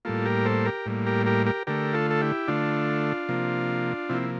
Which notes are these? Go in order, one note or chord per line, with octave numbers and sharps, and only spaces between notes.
A2 G3 A#3 F4 A4
G4 A#4
A4 C5
G4 A#4
A2 G3 A#3
G4 A#4
G4 A#4
G4 A#4
D3 A3 G4 A#4
F4 A4
A4
E4 G4
D3 A3 D4 F4
C3 F3 A#3
C3 F3 A#3 C4 E4